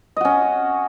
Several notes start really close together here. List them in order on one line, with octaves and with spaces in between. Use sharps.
D#5 F#4 C#4